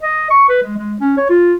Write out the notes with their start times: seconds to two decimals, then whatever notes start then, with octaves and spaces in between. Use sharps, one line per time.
0.02 D#5
0.30 C#6
0.48 B4
0.62 G#3
0.77 G#3
1.00 C#4
1.17 C#5
1.30 F4